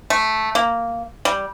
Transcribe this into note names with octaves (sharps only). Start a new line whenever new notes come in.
A3
A#3
G3